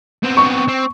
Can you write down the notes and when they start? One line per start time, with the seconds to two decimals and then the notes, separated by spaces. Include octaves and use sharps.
0.23 B3 C4
0.37 C#6
0.68 C4